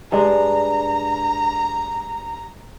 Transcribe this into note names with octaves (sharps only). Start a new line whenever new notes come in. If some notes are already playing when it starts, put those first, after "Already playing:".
G2 G#3 D4 A#5